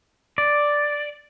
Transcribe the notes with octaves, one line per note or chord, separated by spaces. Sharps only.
D5